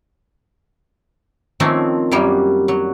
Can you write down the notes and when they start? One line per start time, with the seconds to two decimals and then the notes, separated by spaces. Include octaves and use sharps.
1.60 D#3 F3 A3 A#3 C4 C#4
2.11 F#2 F#3 G3 A#3
2.68 F#3